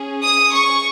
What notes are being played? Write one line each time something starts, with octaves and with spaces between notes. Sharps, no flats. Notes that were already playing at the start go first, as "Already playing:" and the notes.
Already playing: C#4 G#4
D#6
C#6